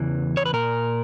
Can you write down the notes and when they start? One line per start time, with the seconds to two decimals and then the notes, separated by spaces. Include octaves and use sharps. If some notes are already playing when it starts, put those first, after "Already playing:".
Already playing: E2 C#3 E3
0.37 C#5
0.46 B4
0.53 A#2 A#4